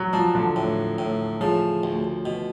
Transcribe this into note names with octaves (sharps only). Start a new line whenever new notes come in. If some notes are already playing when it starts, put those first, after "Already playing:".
Already playing: F#3
F3 D4
D3
A2
A2
C#3 F3
D2
B2